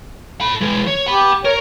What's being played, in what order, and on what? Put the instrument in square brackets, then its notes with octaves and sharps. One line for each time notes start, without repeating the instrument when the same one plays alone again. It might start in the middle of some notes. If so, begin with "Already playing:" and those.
[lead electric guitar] A4 B5
E3 G#3
C#5
[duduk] G4 [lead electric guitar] F#5 B5
[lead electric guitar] A#4 [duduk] C#5